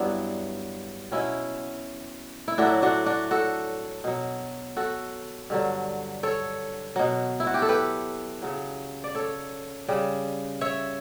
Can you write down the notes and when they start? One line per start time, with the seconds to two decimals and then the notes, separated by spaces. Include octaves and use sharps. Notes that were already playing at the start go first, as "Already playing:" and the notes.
Already playing: G2 F#3 B3 D4 E4
1.11 B2 F#3 C#4 E4
2.48 E4
2.58 A2 F#3 D4 F#4
2.82 D4 F#4
3.06 D4 F#4
3.31 F#4 A4
4.04 B2 F#3
4.76 F#4 A4
5.50 G2 D3 F#3
6.23 A4 C#5
6.96 B2 F#3
7.40 E4
7.47 F#4
7.54 G4
7.62 A4
7.69 G4 B4
8.42 C#3 F#3
9.04 D5
9.15 A4 C#5
9.88 C#3 G3
10.61 C#5 E5